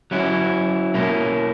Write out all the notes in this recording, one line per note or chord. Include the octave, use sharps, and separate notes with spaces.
F#3 C#4 E4
B2 A#3 C#4 E4